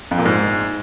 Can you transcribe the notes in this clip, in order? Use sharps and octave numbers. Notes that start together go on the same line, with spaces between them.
F2
A#2
G#2